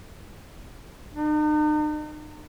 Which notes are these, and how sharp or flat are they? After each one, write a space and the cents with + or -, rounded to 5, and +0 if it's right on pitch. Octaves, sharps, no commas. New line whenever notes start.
D#4 -45